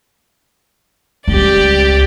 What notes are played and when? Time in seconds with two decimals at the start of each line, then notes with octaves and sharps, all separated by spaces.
1.28 C#2 G3 G4 D5